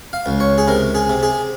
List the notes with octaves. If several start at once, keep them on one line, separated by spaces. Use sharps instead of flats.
F5
C#2
C#5
G#4
C3 A#4
G#4
C3
G#4